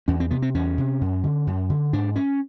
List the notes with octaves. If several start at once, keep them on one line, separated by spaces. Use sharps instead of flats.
E2 C#4
C4
C3 B3
C4
E2 C#4
C3
F#2
D3
F#2
D3
G#2 D4
C#4